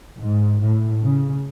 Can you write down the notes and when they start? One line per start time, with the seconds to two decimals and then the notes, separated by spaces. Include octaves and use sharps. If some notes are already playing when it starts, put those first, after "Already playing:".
0.18 G#2
0.61 A2
1.03 C#3